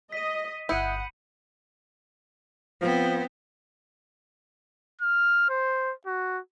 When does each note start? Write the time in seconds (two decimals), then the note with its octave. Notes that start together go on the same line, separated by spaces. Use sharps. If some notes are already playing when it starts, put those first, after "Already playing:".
0.12 D#5 B6 D#7
0.69 G1 E4 F#5 B5 D#6 G6 C#7 D#7
2.81 F3 B3 C4
5.01 F6
5.50 C5
6.06 F#4